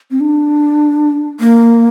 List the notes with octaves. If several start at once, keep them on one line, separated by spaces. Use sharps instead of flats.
C4
D4
A#3